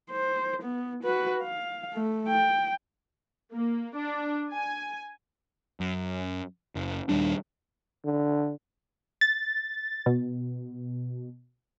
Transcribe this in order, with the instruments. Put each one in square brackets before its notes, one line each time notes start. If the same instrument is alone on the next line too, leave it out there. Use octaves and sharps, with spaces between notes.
[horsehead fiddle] C5
B3
F#4 B4
F5
A3
G5
[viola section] A#3
D4
G#5
[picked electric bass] F#2
F#1
D#1 D#2 G3 D4
[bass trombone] D3
[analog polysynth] A6
B2